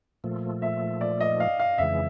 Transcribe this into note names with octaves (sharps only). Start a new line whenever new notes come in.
A#2 F3 A3
E5
D5
D#5
F5
F5
F2 C#3 E3 G#3 E5